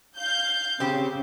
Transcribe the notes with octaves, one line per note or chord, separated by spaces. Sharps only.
F5 G6
C#3 C4 G4